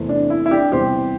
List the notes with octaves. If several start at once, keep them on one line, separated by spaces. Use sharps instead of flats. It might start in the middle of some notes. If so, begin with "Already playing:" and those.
Already playing: E2 C3 E3 A3 C4
D4
E4
E4
D4 G4
E2 C3 E3 G3 G4 C5